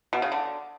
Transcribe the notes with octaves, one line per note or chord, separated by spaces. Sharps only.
B2
C#3
D3